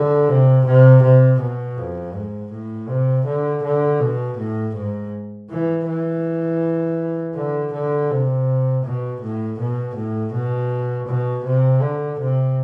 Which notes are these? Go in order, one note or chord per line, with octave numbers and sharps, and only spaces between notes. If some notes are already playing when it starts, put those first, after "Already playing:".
Already playing: D3
C3
C3
C3
B2
F2
G#2
A2
C3
D3
D3
B2
A2
G#2
E3
E3
D3
D3
C3
B2
A2
B2
A2
B2
B2
C3
D3
C3